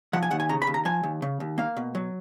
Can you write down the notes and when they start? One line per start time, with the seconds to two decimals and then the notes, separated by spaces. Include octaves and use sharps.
0.13 F3 F#5
0.23 G#5
0.31 D#2 F#5
0.40 G#5
0.49 C#3 A#5
0.62 B5
0.67 D#2
0.74 A#5
0.85 F3 G#5
1.03 D#2
1.22 C#3
1.40 D#2
1.58 A#3 F5
1.77 B2
1.95 F#3